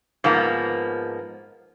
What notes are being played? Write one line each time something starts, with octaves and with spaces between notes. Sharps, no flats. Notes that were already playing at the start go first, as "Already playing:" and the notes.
G#2 F3 A#3 B3